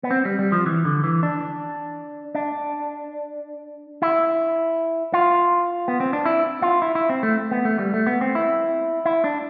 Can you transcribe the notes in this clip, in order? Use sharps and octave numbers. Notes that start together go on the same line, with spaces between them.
B3
C4
G3
G3
F3
E3
D3
E3
D4
D4
E4
F4
B3
C4
D4
E4
F4
E4
E4
C4
A3
B3
A3
G3
A3
B3
C4
E4
E4
D4